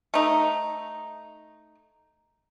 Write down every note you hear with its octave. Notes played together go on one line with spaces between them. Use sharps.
A3 D#4